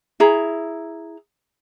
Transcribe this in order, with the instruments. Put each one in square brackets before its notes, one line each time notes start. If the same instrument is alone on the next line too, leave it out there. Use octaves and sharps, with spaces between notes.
[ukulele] E4 G#4 A#5